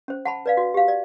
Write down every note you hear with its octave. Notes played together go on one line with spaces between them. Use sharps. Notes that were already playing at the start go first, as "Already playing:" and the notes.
C#4 C5
F#5 A5 B5
B4 D5 F5
F#4
G4 F5
D5